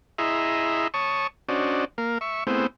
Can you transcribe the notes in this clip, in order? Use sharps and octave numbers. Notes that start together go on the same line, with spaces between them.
E4 G#4 D#5 E5 A#5 C6
C#5 A5 C#6 D#6
C#4 D4 F#4 C5 D5 D#5
A#3 A#4 F5
E5 C#6
A3 B3 C4 E4 G#4 C5